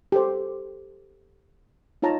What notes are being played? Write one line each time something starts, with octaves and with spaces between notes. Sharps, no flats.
G4 A4 C5
D#4 F4 C#5 A5 A#5